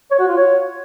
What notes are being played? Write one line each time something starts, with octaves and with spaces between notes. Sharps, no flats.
C#5
F#4
F4
C#5